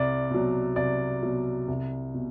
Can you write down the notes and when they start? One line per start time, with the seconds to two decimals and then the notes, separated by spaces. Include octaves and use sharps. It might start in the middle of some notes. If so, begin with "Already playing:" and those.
Already playing: C2 D5
0.30 B2 F#3
0.76 C2 D5
1.22 B2 F#3
1.68 C2
2.14 B2